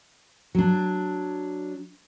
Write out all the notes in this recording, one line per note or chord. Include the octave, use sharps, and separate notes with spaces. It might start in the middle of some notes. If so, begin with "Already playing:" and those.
F#3 D4